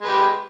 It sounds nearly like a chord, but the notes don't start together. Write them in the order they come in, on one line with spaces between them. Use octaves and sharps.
G#3 B4 G4